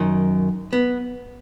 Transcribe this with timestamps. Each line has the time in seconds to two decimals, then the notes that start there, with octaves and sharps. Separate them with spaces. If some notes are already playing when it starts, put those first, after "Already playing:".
Already playing: F#2 D#3
0.73 B3